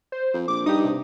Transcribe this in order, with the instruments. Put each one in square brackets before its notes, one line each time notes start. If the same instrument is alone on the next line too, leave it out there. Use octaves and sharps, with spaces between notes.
[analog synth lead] C5
[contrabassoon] F2
[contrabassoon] A#1 [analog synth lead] D6
[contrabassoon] G2 [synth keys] D#4 G4 [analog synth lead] D#6
[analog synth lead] C3